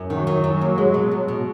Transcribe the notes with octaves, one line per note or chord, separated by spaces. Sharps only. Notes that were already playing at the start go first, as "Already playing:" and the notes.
Already playing: F#2
D#3 F#3
D#3
F#2
A#3
G#3
B2
G#3
B2